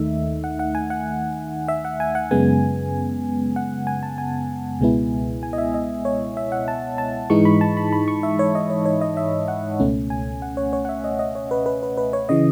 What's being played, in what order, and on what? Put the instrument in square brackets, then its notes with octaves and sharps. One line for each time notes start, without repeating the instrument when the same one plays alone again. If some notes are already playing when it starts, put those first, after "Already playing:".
Already playing: [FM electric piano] D#2 D#3 A3 D#4 E5
F#5
F#5
G#5
F#5
E5
F#5
G#5
F#5
F#2 C#3 G#3 B3 G#5
F#5
G#5
A5
G#5
C#2 B2 G#3 B3 E4
G#5
D#5
E5
D#5
C#5
E5
F#5
A5
A5
G#2 E3 G#3 D#4 C#6
B5
A5
B5
B5
C#6
E5
C#5
D#5
C#5
C#5
D#5
E5
F#5
C#2 B2 A3 C#4
G#5
F#5
C#5
C#5
F#5
E5
D#5
D#5
C#5
B4
B4
B4
B4
C#5
C#3 E3 D#5